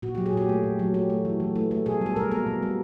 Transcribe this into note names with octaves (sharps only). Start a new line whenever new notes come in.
A#2 F#4
G4
F#3
G#4
A#2 G4
A3
A#2
F#3
A3 G4
A3
E3
E3
A3
A3
B2 G#4
G3 A4
B2 A#4
A#3 A#4
B2
G3